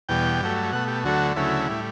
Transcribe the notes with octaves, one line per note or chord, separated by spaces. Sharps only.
E2 B2 G3 G5
G2 F#3 A3
B2 A3 F#5
G4
D2 D3 F#3 A3 F#4
D2 C#3 F#3 A3 E4
A2 G3